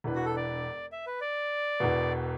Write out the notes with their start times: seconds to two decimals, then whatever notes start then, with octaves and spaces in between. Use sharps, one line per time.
0.04 E1 E2 E3 D4 B4
0.15 F#4
0.26 A4
0.37 D5
0.92 E5
1.07 B4
1.21 D5
1.80 E1 E2 B2 B3